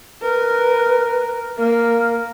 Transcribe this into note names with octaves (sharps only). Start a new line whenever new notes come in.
A#4 B4
A#3 A#4